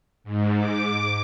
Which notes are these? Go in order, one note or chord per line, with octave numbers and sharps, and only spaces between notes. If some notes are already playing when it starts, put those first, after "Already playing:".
G#2
D6